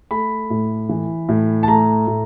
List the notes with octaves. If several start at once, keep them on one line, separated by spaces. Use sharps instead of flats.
A3 B5
A2
E3
A2
A5
A3 A#5
A2